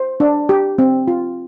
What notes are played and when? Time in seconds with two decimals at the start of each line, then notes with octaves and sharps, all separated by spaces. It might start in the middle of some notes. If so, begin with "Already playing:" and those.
Already playing: C5
0.20 D4
0.49 G4
0.79 C4
1.08 F4